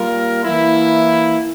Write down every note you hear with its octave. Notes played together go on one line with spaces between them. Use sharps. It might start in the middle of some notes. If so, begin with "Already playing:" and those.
Already playing: G3 A#3 F4 A#4
E3 A#3 E4